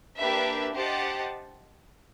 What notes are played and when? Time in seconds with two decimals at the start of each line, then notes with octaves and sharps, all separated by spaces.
0.17 A#3 D4 G4 B4 E5
0.75 G4 C5 D#5 F#5 A5